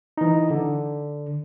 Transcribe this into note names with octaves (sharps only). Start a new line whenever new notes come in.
E3 D#4
D3